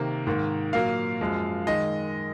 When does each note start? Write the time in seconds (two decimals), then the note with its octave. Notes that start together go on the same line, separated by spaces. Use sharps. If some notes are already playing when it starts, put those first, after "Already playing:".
Already playing: C3 D#3 A#3
0.27 G#2 D#3 A#3
0.73 A#2 F#3 A#3 F5
1.21 F#2 F3 G#3
1.67 D#3 G#3 D#5